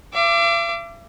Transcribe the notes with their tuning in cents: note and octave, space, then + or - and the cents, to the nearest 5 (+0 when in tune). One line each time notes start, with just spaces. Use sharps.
E5 +45 D6 +0